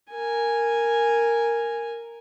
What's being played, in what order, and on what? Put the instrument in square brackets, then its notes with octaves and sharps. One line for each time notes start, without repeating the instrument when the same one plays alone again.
[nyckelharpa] A#4 G#5